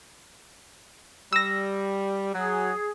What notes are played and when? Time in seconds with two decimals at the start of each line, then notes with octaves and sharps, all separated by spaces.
1.33 G3 E6 A#6
2.33 F#3 G#4